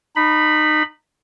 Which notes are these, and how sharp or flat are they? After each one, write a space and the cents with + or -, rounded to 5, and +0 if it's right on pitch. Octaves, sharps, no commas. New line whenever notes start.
D#4 -25 B5 +0